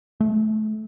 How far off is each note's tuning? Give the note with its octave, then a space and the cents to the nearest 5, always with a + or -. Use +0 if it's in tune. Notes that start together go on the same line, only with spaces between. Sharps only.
A3 -25